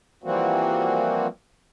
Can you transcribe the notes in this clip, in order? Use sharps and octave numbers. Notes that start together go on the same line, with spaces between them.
E3 F3 G3 A#3 C4 F#4